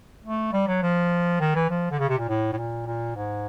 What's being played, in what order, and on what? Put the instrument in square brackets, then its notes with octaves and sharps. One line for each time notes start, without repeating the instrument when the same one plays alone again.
[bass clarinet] A3
G3
F#3
F3
D#3
E3
F3
D3
C#3
C3
A#2
A2
A2
A#2
A#2
G#2